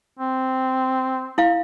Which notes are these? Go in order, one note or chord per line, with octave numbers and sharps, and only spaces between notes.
C4
E4 F5